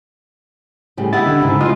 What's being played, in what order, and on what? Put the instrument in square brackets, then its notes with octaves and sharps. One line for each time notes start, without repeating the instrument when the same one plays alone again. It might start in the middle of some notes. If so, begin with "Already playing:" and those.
[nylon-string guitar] A2 C#3 G3
[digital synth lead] E4 [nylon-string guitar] G4 D#5 F#5 [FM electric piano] A6
[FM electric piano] D3
[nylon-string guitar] G#2 [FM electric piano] C#3
[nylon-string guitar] F#2 [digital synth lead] F4 [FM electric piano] D#5 D#6